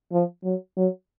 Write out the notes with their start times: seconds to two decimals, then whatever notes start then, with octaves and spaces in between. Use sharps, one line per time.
0.12 F3
0.44 F#3
0.77 F#3